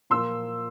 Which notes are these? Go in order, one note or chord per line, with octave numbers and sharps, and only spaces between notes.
A#2 F3 A#3 C6 E6